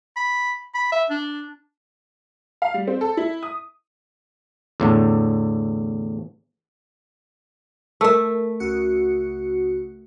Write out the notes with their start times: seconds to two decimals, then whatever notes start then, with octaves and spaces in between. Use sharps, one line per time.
0.16 B5
0.75 B5
0.92 E5
1.10 D4
2.62 F5
2.74 G3
2.88 C4
3.01 A4
3.17 E4
3.43 D#6
4.80 E2 A2 D3
8.01 A3 A#4 E5
8.60 C#2 F#4 C#7